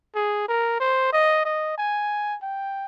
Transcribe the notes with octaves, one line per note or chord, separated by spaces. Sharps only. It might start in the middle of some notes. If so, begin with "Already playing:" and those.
G#4
A#4
C5
D#5
D#5
G#5
G5